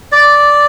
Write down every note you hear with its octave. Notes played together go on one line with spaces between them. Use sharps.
D5